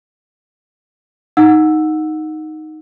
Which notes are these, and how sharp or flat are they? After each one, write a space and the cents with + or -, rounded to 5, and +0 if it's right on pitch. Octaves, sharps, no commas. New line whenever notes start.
D#4 +0 F#5 -15 E6 +0